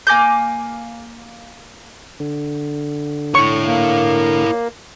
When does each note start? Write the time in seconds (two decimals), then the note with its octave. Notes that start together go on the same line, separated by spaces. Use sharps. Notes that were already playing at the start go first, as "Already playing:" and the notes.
0.07 A#3 G#5 D6 G6
2.20 D3
3.35 E4 C#5 C#6
3.66 A#3